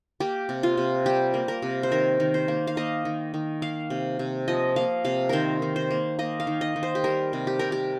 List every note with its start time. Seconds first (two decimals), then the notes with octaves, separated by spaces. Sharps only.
0.20 A#3 G4
0.49 C3
0.63 F4
0.77 C3
1.06 G3 G4
1.34 A#3
1.48 A#4
1.62 C3
1.83 C5
1.91 D#3 A#4
2.20 D#3
2.34 C5
2.48 A#3
2.67 F5
2.77 A#3 D#5
3.05 D#3
3.34 D#3
3.62 A#3 F5
3.90 C3
4.19 C3
4.48 F3 D#5
4.76 A#3 F5
5.05 C3 F5
5.29 D#3 A#4 C5
5.62 D#3
5.76 C5
5.90 A#3
6.19 A#3 D#5
6.40 F5
6.47 D#3
6.61 D#5
6.76 D#3
6.83 C5
6.95 G4
7.04 G3 A#4
7.33 C3
7.47 G4
7.59 C3 A#4
7.72 G4